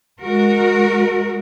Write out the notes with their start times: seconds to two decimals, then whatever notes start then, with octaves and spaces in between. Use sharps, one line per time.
0.21 G#3 F#4 A#4